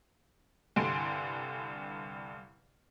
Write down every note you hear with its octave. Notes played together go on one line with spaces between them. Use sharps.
C2 G2 D3 G#5 C6 D7